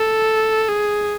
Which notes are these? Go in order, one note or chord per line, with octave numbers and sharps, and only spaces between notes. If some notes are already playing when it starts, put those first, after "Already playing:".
Already playing: A4
G#4